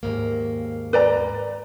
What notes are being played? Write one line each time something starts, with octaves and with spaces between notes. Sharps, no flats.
D#2 G#2 A#3
B4 D5 A#5